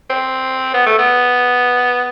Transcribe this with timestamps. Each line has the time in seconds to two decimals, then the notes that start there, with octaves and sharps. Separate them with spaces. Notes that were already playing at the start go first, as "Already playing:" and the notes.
0.10 C4
0.74 B3
0.86 A3
0.99 B3